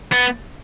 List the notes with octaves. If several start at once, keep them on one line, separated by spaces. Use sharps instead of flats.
B3